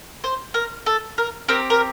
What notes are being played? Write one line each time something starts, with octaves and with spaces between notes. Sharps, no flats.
C5
A#4
A4
A#4
C4 G4 A#4
A#4